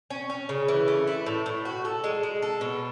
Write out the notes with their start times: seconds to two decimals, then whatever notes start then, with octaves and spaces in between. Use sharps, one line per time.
0.10 C#4
0.30 C#4
0.49 C#3
0.68 E3
0.88 A3
1.07 E4
1.26 A2
1.46 A2
1.65 F#4
1.85 A4
2.04 G#3
2.23 G#3
2.42 A4
2.61 B2